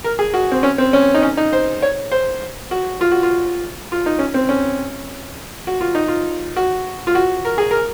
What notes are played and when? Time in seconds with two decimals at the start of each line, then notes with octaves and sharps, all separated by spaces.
0.04 A#4
0.19 G#4
0.34 F#4
0.52 C4
0.63 C#4
0.78 C4
0.93 C#4
1.14 D#4
1.22 C#4
1.37 D#4
1.53 C5
1.82 C#5
2.12 C5
2.71 F#4
3.01 F4
3.12 F#4
3.23 F4
3.92 F4
4.06 D#4
4.19 C#4
4.34 C4
4.49 C#4
5.67 F#4
5.81 F4
5.95 D#4
6.08 F4
6.56 F#4
7.07 F4
7.15 F#4
7.45 A#4
7.58 G#4
7.71 A#4